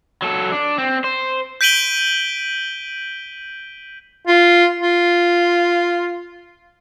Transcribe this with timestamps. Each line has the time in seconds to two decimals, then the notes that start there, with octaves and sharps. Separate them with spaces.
0.22 F#3 A4
0.52 D4
0.78 C4
1.04 C5
1.61 G6 B6 D7 D#7 F#7 G7
4.27 F4
4.80 F4